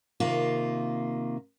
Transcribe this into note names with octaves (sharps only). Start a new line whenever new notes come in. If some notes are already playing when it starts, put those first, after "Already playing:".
C3 D#3 A#3 F4